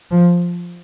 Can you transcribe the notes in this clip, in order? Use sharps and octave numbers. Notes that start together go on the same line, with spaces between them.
F3